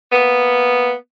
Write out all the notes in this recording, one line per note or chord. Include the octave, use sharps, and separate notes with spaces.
A#3 B3